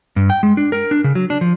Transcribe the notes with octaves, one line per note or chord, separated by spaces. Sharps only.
G2
G5
G#3
D4
A#4
D4
C#3
F#3
D4
F3